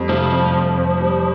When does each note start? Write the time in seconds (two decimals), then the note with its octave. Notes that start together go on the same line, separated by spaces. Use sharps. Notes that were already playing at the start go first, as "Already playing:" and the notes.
Already playing: F2 G3
0.09 C3 F3
0.31 F2
0.55 F2
0.77 F2
1.00 G3